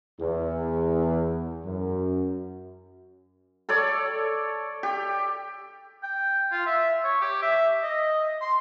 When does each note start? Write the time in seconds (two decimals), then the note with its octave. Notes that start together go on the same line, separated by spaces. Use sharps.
0.20 E2
1.65 F#2
3.69 A4 C#5 D5
4.83 G4
6.03 G5
6.52 F4
6.66 E5
7.04 C#5
7.22 G4
7.42 E5
7.83 D#5
8.41 C6